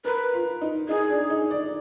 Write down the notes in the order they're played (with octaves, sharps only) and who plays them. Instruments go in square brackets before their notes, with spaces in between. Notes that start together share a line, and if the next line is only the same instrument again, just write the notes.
[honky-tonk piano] A#4 [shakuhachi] B4
[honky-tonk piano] F4
D#4
[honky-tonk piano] D#4 [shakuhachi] G#4
[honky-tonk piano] D4
D#4
D5